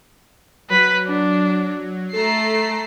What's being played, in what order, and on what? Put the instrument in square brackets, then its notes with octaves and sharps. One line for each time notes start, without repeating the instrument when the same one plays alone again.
[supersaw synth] F#3 [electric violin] B4 B5
[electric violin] D4
[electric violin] A3 C7 [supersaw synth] A4 A#5